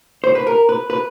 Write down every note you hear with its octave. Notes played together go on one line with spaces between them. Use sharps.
C5
B4
A#4
B4
B4